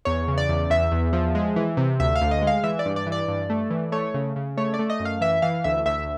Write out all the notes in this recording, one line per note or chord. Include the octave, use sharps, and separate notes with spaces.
E2 C#5
C#3
D5
E2
E2 E5
E2
F3
G#3
E3
C3
D2 E5
F5
D2
D#5
G#3
F5
E3 E5
D5
G2
D5
E3
D5
G2
A3
E3
A3 C#5
C#3
C#3
A3 C#5
D5
A3
D#5
F#2
F5
E3 E5
E3 F5
D2 E5
D2 E5